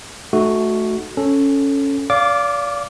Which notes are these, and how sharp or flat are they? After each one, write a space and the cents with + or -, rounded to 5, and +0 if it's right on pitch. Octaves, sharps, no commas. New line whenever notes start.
A3 -15 D#4 -30 F#4 +0
C#4 +0 A4 +0
D5 -35 F5 +0 D6 +0